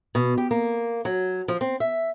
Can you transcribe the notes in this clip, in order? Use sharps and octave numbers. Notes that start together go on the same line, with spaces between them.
B2
G4
A#3
F#3
F3
C4
E5